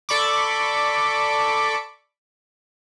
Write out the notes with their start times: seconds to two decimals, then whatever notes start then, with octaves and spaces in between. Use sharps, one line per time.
0.09 A4 D5 B5 C#6 D6